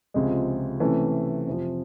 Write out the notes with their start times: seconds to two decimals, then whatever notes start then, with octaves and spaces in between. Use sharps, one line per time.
0.14 C#2 C3 F3 G#3
0.80 C3 E3 A3 C#4
1.47 F2 C3 F3